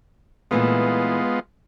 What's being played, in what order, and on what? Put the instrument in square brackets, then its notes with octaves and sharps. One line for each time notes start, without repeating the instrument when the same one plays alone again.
[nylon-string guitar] A#2 E3 A3 [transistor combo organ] G#3 B3 F4